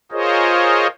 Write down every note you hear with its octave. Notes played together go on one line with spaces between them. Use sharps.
F4 G#4 A#4 C5 C#5 D#5